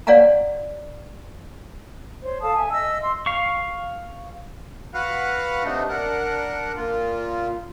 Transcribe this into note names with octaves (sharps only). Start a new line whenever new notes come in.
C#5 D5 F5 F#5 G#5 A#5
C5 C#5
A4 F5 A5 D#6
E5 G#5
D#5 E5 E6
C6 E6
F5 C#6
F#4 B4 F5 F#5
C3 A3 D4 D#4
D4 A#4 F#5
A#2 F4